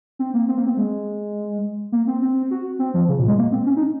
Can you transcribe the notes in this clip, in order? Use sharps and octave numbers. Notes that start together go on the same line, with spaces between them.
C4
A#3
C4
A#3
C4
G#3
A#3
C4
C4
F#4
C4
F3
C#3
A#2
G#3
A#3
C4
C#4
D#4